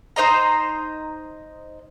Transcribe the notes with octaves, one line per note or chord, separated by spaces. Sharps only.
D#4 C5 D#5 A#5